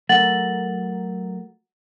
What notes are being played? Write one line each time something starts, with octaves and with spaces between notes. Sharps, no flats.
F#3 A3 A#4 F#5 A6 F#7